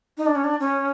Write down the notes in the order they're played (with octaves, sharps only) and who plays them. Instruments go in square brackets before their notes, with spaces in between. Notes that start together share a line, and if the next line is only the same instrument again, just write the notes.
[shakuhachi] D#4
D4
C#4
D4
C#4